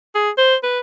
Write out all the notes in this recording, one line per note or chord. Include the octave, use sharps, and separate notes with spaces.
G#4
C5
B4